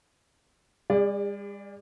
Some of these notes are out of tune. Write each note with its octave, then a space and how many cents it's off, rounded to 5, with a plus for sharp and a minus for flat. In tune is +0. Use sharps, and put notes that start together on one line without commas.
G3 +45 G#4 -40 D5 +0